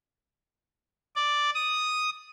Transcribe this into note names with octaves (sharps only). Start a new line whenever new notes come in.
D5
D#6